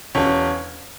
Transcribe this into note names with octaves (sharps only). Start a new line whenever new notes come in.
E1 C#4